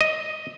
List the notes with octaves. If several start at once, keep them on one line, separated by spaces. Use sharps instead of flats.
D#5